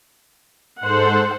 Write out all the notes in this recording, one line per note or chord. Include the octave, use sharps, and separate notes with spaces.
G#2 A4 C5 F#5